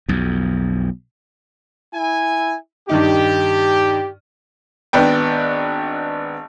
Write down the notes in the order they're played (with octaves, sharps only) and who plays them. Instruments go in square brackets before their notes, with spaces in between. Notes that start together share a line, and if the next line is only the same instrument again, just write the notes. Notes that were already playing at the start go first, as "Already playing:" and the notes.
[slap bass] B1 F2
[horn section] E4 G#5
[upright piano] G2 D#3 D#4 [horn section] G4
[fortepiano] G#1 B3 D4 G5